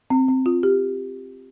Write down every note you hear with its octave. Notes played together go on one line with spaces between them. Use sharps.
C4
C4
F4
G4